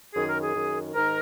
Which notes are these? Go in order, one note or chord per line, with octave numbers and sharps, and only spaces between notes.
F#2 D#3 G#4
A#4
G#4
F#2 D#3
G#2 D#3 A#4